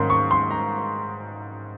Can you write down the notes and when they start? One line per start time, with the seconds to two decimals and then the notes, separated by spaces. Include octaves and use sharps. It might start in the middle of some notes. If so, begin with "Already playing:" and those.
Already playing: G#2 D#3 A#3 C#4 C6
0.10 C#6
0.31 C6
0.51 A#5